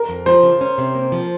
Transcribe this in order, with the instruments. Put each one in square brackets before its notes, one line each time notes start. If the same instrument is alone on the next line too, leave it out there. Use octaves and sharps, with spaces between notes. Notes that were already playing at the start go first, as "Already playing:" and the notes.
Already playing: [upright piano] A#4
[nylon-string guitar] F2
[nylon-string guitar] F3 [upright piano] C5
[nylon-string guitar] C#3
C#4
C3
A#3
F3